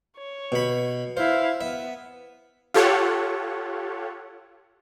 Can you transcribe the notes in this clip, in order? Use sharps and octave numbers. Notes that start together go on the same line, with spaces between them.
C#5
B2 B5
E4 C5 F5
B3 E5
F4 G4 A4 C#5 F#5